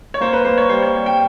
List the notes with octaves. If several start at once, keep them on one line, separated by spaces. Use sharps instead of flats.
C#5
A#3 C5
B4
A#3 C5
C#5
G3 C5
C#5
G3
G5